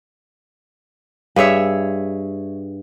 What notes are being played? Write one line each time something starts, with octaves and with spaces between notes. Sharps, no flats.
G2 G#4 C#5 E5